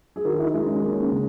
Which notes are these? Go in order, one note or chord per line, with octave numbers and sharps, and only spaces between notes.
G#4
D#3 F#4 A#4
E4
D#4
G#3
C#4
A#3 C#4
C#3